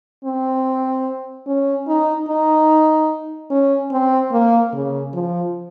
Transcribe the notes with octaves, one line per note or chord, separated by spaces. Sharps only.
C4
C#4
D#4
D#4
C#4
C4
A#3
C#3
F3